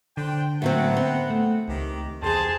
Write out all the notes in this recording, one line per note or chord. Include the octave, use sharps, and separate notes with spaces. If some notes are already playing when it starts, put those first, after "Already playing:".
D3 D4 C5 G5
A2 F#3 B3 C4 F#5
C4
A3
C#2 D#3 G4
E2 C3 G#4 C5 A5